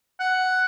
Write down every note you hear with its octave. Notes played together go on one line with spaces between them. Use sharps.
F#5